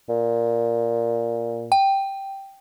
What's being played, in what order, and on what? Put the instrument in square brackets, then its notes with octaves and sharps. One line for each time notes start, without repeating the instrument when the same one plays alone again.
[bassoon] A#2
[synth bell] G5